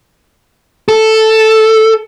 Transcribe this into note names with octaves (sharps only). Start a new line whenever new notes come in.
A4